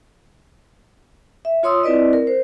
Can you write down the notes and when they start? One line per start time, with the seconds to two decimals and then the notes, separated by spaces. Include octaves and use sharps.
1.45 E5
1.63 F4 C#5 C6 D#6 E6
1.83 C4 E4 B4 D5 D#5
2.13 A#4
2.27 C5